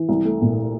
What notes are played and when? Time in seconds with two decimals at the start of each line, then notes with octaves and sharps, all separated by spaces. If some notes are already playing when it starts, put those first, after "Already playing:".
Already playing: E3
0.09 C2
0.25 A3
0.41 A#2